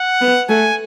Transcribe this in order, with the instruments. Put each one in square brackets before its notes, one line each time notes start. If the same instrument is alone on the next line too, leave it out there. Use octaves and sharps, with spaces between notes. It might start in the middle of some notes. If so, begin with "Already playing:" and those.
Already playing: [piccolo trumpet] F#5
[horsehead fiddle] B3
[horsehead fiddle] A3 [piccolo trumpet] G#5